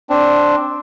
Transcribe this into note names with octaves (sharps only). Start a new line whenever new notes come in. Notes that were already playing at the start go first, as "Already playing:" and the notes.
C4 D4